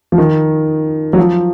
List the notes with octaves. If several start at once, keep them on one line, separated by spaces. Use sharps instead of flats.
F3
D#3
F#3
F3